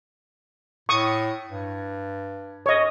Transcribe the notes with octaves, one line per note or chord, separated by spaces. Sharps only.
A2 C#6 D#6
G2
C#5 D#5